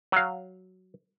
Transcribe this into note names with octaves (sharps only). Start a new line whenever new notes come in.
F#3 F5